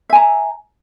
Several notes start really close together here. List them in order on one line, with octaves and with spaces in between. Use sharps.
E5 G#5 A#5